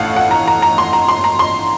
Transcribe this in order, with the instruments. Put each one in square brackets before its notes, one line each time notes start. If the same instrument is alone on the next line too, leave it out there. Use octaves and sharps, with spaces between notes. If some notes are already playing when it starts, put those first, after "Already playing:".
Already playing: [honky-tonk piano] A1 A2 A3 F5 F#5
F#5
A#5
A#5
A#5
C6
A#5
C6
A#5
C6